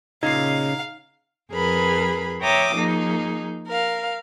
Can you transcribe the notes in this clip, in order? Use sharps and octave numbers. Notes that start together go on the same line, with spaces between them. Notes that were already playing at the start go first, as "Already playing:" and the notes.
A#2 C#3 D#4 D#5 F5 C7
F2 G#4 A#4 B4 B5
C#5 E5 G5 A#5 D6 D#6
F3 A#3 D#4 G#4
A#4 F5